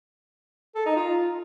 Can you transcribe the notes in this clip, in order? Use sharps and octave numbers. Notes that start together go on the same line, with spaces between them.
A4
D#4
F4